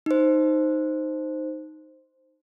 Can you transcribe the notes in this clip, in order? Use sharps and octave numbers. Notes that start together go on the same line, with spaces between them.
D#4 C5